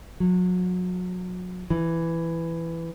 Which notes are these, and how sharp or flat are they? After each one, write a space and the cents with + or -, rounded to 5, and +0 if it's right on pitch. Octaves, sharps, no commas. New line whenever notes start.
F#3 -30
E3 +10